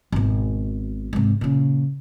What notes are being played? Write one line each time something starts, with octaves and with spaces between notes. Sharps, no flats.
G#1 B2
G#2 C3
A#2 C#3